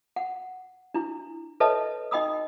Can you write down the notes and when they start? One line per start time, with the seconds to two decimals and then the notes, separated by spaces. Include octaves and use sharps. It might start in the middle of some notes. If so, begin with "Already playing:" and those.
0.16 F#5
0.94 D4 E4
1.60 A4 B4 C#5 D#5 E5 A5
2.11 D#4 D#5 G5 B5 D#6 E6